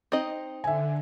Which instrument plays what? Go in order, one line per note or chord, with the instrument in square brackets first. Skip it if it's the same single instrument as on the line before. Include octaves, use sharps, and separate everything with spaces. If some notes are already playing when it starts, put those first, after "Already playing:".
[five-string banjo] C4 D#4 D#5
[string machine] D3 [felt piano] E5 G#5